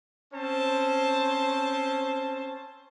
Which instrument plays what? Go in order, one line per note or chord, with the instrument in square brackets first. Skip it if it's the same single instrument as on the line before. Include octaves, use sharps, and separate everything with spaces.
[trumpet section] C4 C#4 C5 A5